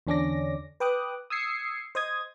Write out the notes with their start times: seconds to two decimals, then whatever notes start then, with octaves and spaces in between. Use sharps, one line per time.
0.07 E2 D3 C#4 D4 D6 A#6
0.80 B4 G5 D6 D#6 F#6
1.30 D#6 E6 G#6 C7 C#7
1.95 C5 D#5 D#6 G#6